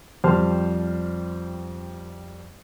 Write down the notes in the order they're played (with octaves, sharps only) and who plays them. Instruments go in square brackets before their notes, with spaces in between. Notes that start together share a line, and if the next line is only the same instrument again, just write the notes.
[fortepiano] F2 G3 C5 A5 C6 F6